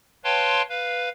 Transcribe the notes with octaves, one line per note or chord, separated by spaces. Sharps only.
B4 C#5 F5 G5 A5 C6
B4 F5